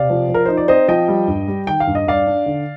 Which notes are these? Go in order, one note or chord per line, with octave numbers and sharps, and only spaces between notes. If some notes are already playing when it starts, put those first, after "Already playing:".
Already playing: C3 D5 F5
F3
F3
A#4
D#4 C5
D5
C4 C5 D#5
F3 D#5 G5
G3
G2
G3
D#3 G5
F5
G2
D#5
G2 D5 F5
D4
D3